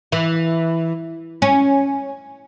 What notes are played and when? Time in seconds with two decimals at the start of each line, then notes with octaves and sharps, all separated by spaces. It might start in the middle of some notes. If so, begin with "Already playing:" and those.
0.12 E3
1.42 C#4